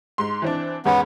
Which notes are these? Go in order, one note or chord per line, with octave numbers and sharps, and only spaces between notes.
G#2 C6
E3 C4 D4
E2 G#2 B3 C#4